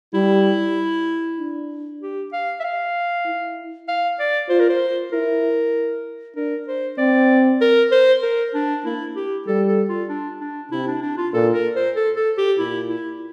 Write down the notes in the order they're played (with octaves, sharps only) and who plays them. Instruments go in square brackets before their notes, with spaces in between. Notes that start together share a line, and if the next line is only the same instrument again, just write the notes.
[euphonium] G3 [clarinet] E4
[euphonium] D4
[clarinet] G4
F5
E5
F5
[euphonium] E4
[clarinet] F5
D5
[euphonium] F4 [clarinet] C5
[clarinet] A#4
C5
[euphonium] E4 [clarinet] A#4
[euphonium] D4 [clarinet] A#4
[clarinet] C5
[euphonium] C4 [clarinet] D5
[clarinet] A#4
C5
A#4
D4
[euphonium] A#3 [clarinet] E4
[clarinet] G4
[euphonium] G3 [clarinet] A4
[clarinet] A4
F4
D4
D4
[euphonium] C3 [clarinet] E4
[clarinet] D4
D4
F4
[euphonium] A#2 [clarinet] A4
[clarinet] A#4
C5
A4
A4
G4
[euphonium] A#2 [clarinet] E4
[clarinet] E4